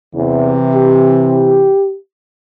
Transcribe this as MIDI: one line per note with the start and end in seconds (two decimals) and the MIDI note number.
0.15 0.56 40
0.15 1.71 48
0.15 1.71 52
0.75 1.97 67